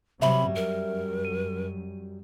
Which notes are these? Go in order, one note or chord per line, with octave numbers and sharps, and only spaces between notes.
C3 F#3 G3 E5 B5
F#2 A#4
D#7